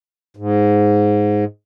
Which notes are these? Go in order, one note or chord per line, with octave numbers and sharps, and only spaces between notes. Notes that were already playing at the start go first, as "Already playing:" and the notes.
G#2